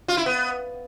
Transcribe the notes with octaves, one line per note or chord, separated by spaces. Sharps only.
F4
E4
B3